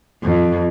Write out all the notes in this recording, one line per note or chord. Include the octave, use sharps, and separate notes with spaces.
F2